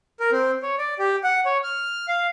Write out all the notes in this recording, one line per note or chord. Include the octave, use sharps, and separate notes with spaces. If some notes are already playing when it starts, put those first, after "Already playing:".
A#4
C4
C#5
D5
G4
F#5
C#5
F6
F5